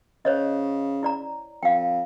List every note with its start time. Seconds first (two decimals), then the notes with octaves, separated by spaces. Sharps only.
0.25 C#3 C5 C#5 D#5
1.03 E4 D5 A#5
1.63 F2 F5 G5